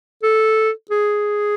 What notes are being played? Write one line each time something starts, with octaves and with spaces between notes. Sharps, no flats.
A4
G#4